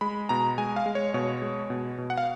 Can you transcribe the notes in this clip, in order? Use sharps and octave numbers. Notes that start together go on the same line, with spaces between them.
G#3 B5
B2 A#5
G#3 G#5
F5
G#3
C#5
B2 C#5
G#3
B2
B2
F#5
F5